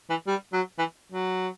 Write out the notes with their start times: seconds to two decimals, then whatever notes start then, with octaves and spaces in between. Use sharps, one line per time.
0.10 E3
0.27 G3
0.53 F#3
0.79 E3
1.12 F#3